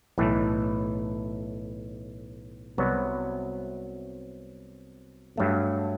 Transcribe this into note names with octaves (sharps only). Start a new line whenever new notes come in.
B1 A2 E3 A3
C2 C3 F#3 B3 F#4
G2 F#3 A3